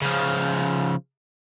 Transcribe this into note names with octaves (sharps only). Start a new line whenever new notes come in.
C#3 F3